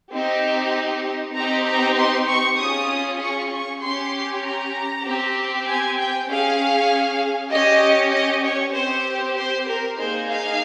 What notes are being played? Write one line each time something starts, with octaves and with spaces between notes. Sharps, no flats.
C4 D#4 G4
C4 D#4 G4 A#5
A#5
C6
C#6
C#4 F4 G#4 D#6
C#6
C#6
C#4 G4 C6
A#5
C4 G4
G#5
G5
C#4 G#4 F5
C#4 G4 D#5
D#5
C#5
C4 G4 C5
C5
A#4
A#3 D#4 G#4 C5
F5